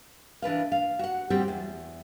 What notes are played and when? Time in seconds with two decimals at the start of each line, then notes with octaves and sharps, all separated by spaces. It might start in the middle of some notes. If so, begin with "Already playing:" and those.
0.42 E3 D4 B4 F5
0.72 F5
0.99 F#4 F#5
1.30 G3 C4 F#4 G4
1.48 E2